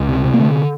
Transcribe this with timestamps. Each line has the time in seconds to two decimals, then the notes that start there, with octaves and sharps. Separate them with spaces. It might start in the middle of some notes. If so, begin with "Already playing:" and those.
Already playing: C#2
0.09 C3
0.24 C3
0.34 A#3
0.40 D3 A3